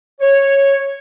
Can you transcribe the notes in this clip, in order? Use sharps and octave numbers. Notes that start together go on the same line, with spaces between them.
C#5